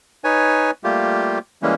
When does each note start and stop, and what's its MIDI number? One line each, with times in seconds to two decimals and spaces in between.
0.24 0.71 63
0.24 0.71 71
0.24 0.71 73
0.24 0.71 80
0.84 1.39 55
0.84 1.39 57
0.84 1.39 58
0.84 1.39 65
0.84 1.39 67
1.62 1.75 52
1.62 1.75 55
1.62 1.75 56
1.62 1.75 58
1.62 1.75 61